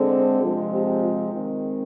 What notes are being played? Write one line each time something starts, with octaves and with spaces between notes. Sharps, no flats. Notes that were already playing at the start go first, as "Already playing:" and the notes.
Already playing: D3 G#3 C4
C3 F3 G#3 C4 F4
G4
F4
D#3 G#3 C4